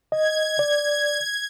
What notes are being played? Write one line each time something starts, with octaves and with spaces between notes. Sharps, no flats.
D#5 G#6
D5